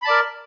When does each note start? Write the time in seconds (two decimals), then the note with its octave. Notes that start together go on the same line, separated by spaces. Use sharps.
0.02 B5
0.05 A5
0.07 D5
0.10 A#4